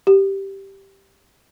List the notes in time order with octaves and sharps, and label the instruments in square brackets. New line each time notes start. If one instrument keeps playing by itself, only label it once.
[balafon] G4